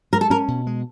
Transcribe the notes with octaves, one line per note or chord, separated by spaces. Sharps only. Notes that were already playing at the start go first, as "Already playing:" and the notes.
G#3 A#4
A4
C#4 A#4
B2
G#3